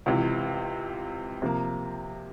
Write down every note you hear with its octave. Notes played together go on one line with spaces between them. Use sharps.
C#2 C3 E3
C3 F3 A#3